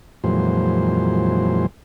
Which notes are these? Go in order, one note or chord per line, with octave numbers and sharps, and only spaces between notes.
F2 A#2 E3 F#3 G#3 C5